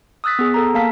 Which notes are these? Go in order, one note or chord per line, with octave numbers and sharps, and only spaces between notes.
D#6 E6 F#6 A6 B6
B3 G#4
A4 A#5
A#3 F5 A5 B6